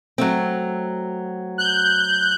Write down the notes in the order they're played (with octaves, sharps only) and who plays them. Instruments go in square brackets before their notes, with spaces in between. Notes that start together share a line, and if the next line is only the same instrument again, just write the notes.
[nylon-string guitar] F#3 A3 C4
[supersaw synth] F#6 G6